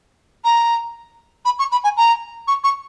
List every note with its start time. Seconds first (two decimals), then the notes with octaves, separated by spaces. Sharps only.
0.44 A#5
1.45 B5
1.59 C#6
1.71 B5
1.84 G#5
1.97 A#5
2.47 C#6
2.63 C#6